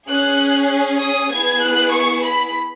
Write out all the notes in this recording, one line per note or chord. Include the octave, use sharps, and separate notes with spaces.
C#4 G#4 F#6
D#6
B3 E4 G#4 G#6
F#6
C#6
B5